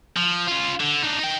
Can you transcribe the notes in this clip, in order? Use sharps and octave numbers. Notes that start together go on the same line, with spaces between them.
F3
C#4 F4
D3
D4 D#4
D#4 G5